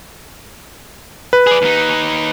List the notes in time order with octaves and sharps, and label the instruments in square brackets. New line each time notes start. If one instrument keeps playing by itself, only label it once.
[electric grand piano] B4
[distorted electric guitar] G#4 D5
D#2 D#4